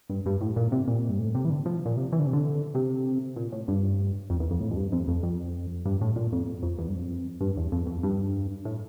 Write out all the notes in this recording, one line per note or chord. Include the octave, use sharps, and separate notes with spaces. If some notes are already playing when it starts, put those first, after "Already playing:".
G2
G2
A2
A#2
C3
A#2
G2
A2
C3
E3
D3
F3
A#2
C3
E3
D3
C3
D3
C3
A#2
A2
G2
F2
E2
F2
A2
F2
G2
F2
F2
F2
G2
A2
A#2
F2
F2
E2
G2
F2
G2
E2
F2
F2
G2
A2